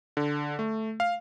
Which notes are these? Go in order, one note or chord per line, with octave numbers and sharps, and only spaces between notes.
D3
A3
F5